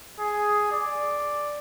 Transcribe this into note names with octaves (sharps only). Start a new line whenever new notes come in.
G#4
D5